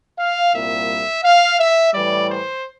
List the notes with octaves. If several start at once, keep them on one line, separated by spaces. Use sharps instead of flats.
F5
C2 A#2 G3 E5
F5
E5
A2 E3 G3 D5
C5